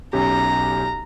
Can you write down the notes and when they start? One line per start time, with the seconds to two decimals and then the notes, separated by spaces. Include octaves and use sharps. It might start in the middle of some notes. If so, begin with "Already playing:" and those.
0.13 B1 C#4 G4 A#5